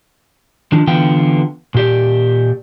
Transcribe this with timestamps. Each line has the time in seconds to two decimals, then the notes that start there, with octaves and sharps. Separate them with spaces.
0.72 D#3 F3 D4
0.87 D3 E3 B3 F4 G5
1.74 A#2 G4 D5